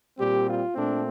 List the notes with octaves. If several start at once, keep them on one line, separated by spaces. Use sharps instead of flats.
A#2 G3 C4 G4
F4
A#2 A3 C4 D4